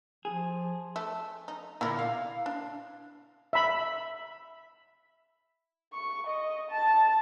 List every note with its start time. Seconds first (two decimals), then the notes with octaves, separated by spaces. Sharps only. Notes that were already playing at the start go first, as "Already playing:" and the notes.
0.25 F3 G#4
0.96 A3 E5
1.48 D#4
1.81 A#2 D3 E4 F4 A#4
1.99 F5
2.46 D4
3.53 E5 B5
5.93 C#6
6.26 D#5
6.71 A5